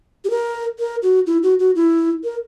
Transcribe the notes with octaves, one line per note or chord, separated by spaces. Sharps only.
G4
A#4
A#4
F#4
E4
F#4
F#4
E4
A#4